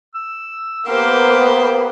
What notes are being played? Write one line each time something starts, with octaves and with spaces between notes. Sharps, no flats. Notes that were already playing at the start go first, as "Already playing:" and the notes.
E6
A#3 B3 G4 A#4 C5